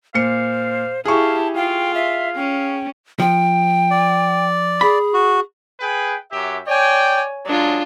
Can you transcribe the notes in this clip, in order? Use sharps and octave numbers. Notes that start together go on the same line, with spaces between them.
A#2 C5 F5 C#7
E4 G4 G#4 F5 A5 C#6
F4 F5 G5
E5
C#4 G5
F3 G5
D5
G#4 B5
F#4
G#4 B4 G5
F#2 G4 E5
C#5 D5 G5 G#5
F#2 F#3 G#3 D4 F4